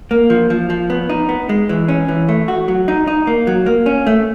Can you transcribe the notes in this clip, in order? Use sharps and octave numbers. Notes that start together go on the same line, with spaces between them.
A#3
F3
F3
F3
B3
D#4
B3
G#3
E3
C#4
E3
A3
F#4
F#3
D#4
D#4
A#3
F#3
A#3
C#4
A3